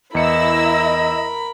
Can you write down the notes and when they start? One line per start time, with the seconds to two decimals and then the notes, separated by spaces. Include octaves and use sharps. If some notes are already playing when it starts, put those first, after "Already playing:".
0.15 E2 E4 A#4 D#5 B5 E6 C#7